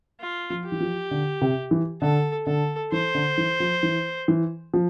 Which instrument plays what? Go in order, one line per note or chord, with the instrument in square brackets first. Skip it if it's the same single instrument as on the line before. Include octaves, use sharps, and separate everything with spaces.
[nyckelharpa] F4
[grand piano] F3
[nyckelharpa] G4
[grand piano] E3
F3
D3
C3
E3
[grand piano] D3 [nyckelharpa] A4
[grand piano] D3 [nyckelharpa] A4
[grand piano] E3 [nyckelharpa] C5
[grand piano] D3
E3
F3
E3
E3
F3